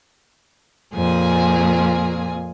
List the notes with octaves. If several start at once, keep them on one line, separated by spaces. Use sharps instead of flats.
F2 A#2 A#3 G#4 G#5